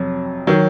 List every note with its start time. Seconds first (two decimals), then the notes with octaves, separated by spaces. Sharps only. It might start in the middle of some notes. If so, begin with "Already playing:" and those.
Already playing: F2 C3 F#3
0.47 D#3 F#3